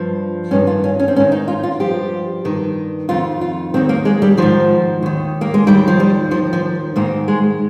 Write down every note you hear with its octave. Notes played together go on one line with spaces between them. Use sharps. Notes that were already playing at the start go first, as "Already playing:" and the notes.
Already playing: G2 F3
G2 D#3 C#4
F4
C#4
C#4
C4
G#2 D#3 C#4
D#4
F4
F4
G2 F3 G4
G2 D#3
F2 D#3 F4
F4
D#2 D#3 C4
A#3
G#3
G3
G#2 D#3 F3
D#2 D#3
A#3
G#3
D#2 D#3 G3
F3
G3
D#2 D#3 F3
F3
G#2 D#3 A#3
G#3